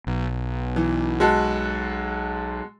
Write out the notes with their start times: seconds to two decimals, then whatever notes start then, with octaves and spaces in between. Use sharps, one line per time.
0.07 B1
0.76 E3
1.20 G#3 F#4 A4